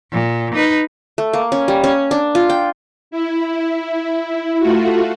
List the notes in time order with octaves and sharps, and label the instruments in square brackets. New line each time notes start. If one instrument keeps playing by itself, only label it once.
[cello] A#2
D#4 B4
[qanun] A3
A#3
C#4
G3
C#4
D4
F4
G5
[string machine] E4
A3 F4 F#4